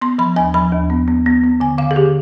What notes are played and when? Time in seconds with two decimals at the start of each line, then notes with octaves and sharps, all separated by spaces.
0.02 B3 C6
0.18 F3 B5
0.36 D#2 G#5
0.54 F3 B5
0.72 D#2
0.90 B3
1.08 B3
1.26 B3
1.44 B3
1.60 D3 G#5
1.78 D3 F5
1.91 G#4
1.96 D3 G4